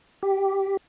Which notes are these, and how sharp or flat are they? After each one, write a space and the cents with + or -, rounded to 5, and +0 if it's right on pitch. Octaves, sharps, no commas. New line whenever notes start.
G4 -5